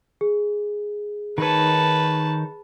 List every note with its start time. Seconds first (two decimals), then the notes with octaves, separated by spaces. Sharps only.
0.21 G#4
1.38 D#3 D#4 B4 C#5 A5